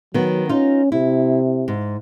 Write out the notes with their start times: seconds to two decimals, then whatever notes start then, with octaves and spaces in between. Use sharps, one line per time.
0.14 D#3 F#3 B3
0.49 C#4 D#4 F4
0.92 C3 E4
1.68 G#2